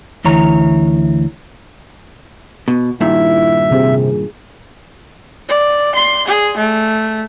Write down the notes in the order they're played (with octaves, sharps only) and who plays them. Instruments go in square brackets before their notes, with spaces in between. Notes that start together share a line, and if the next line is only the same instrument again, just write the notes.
[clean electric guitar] D2 E3 C#5 A#5
[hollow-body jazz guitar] B2
[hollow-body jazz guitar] G2 A#2 D#3 [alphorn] E4 [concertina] E5
[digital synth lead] C3 [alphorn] G#4
[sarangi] D5
C6
G#4
A3